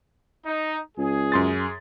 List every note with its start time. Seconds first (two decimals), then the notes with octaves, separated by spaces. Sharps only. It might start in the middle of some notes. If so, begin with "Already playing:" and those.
0.46 D#4
0.98 C#2 G#4
1.32 F#2 C6 A6